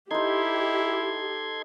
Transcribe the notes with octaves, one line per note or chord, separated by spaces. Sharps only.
D#4 E4 G4 A4 C5 C6 G#6